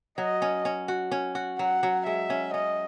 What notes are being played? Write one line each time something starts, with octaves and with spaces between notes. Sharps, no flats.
F#3 D#5
C#4
C#4
F#4
C#4
F#4
F#3 F#5
F#3
G#3 E5
C#4
C#4 D#5